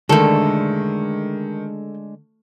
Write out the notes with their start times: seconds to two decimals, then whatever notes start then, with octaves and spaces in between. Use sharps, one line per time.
0.09 D3 D#3 G#3 A3 D4 A4